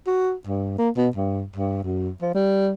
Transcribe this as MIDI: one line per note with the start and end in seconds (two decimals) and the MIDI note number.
0.07 0.33 66
0.47 0.75 43
0.78 0.90 58
0.97 1.08 47
1.16 1.45 43
1.56 1.79 43
1.84 2.10 42
2.22 2.30 53
2.35 2.71 55